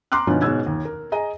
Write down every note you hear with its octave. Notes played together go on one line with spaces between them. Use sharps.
A#5 C6 D6 F6 F#6
B2 D3 F3 B3 C#4 D#4
G#2 B2 C#4 E6 G#6
D#2
A#4
G#4 D#5 A#5